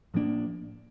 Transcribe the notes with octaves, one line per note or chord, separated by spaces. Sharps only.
A2 F3 A#3 D4